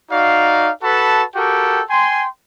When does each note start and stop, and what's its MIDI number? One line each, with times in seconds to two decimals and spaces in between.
0.12 0.70 63
0.12 0.70 66
0.12 0.70 74
0.12 0.70 77
0.83 1.24 66
0.83 1.24 69
0.83 1.24 71
0.83 1.24 81
0.83 1.24 83
1.35 1.81 66
1.35 1.81 67
1.35 1.81 69
1.35 1.81 70
1.35 1.81 79
1.90 2.27 79
1.90 2.27 80
1.90 2.27 84